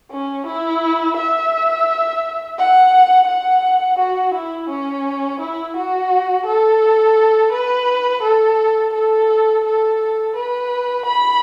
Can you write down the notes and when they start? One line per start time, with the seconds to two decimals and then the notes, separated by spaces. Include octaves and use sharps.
0.11 C#4
0.46 E4
1.17 E5
2.58 F#5
3.28 F#5
3.99 F#4
4.34 E4
4.69 C#4
5.41 E4
5.76 F#4
6.46 A4
7.52 B4
8.23 A4
8.94 A4
9.65 A4
10.36 B4
11.06 B5